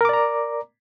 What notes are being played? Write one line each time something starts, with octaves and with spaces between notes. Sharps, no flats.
A#4 D5 A#5 D6